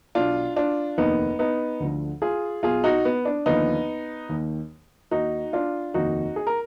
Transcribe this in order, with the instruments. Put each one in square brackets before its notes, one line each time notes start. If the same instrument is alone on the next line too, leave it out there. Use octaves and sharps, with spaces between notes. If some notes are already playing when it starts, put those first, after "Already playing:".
[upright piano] B1 B2 D4 F4
D4 F4
F1 D#2 D#3 B3 D#4
B3 D#4
D2 D3 F3
F4 G#4
B1 B2 F4 G#4
D#4 F#4
B3
D4
D#2 D3 F3 B3 D#4
D#2 D#3
D#2 D#3 D#4 F#4
D4 F4
F1 D#2 D#3 D#4 F#4
G#4
A#4